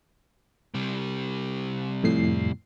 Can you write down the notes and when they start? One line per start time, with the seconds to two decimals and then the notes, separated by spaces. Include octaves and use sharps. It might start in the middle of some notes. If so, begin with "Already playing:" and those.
0.74 C3 G3
2.03 F2 A2 C7